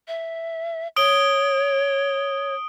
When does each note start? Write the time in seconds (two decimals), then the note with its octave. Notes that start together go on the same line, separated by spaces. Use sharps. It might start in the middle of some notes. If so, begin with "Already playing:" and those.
0.08 E5
0.96 C#5 D#6 D7 G7